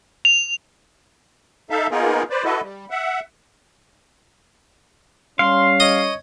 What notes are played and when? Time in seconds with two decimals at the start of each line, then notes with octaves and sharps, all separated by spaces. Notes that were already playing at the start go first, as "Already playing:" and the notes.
0.25 F7
1.70 D#4 A4 E5 F5
1.91 A#3 B3 D#4 F4 G#4 A#4
2.30 B4 C5 D5
2.44 E4 F#4 A4 B4 D#5
2.61 G3
2.90 E5 F#5
5.39 G3 C#4 F5 C6
5.80 C#5 D#5 D#6